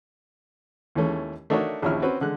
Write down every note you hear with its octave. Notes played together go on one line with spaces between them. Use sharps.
D#2 E3 G#3 A3 C#4
A3 D4 D#4 F#4 A#4 C#5
A#1 D#2 F3 C#4 E4 F6
C4 C#4 F#4 B4
D3 G#3 F#6